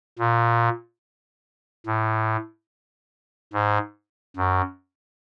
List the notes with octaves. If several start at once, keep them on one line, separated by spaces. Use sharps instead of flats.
A#2
A2
G#2
F#2